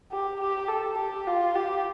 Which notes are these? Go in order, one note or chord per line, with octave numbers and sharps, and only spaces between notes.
G4
G4
A4
G4
F4
G4